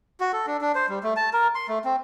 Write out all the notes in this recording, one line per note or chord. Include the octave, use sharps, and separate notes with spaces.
F#4
A4
D4
D4
C5
G3
A3
A5
A#4
C6
A3
C4